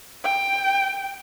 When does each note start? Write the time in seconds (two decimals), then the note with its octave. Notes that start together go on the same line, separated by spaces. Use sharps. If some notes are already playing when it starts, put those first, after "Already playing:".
0.24 G5